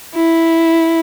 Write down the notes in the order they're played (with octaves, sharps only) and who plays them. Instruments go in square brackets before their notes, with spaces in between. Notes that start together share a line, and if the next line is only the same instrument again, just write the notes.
[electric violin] E4